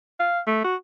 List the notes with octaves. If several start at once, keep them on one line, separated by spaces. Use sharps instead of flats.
F5
A3
F#4